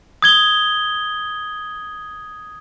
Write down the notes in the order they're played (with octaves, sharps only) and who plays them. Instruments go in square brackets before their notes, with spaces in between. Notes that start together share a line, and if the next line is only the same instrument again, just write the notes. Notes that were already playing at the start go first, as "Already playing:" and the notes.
[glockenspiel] D#6 G#6 G7